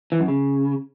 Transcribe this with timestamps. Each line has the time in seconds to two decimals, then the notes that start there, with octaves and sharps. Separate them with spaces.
0.12 E3
0.20 F#2
0.28 C#3